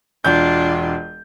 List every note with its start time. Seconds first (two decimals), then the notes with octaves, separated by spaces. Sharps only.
0.25 E1 D4 F4 G6